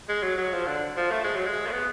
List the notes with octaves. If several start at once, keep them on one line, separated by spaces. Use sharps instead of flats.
G#3
F#3
F#3
F3
D3
F3
A3
G#3
F#3
G#3
A3
B3